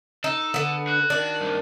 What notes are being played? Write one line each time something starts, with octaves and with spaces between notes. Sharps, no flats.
D#4 A4
D3 B3
F#4
D#3 D4
C2 G2